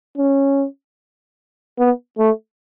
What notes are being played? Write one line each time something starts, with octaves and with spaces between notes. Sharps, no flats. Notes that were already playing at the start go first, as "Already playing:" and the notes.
C#4
B3
A3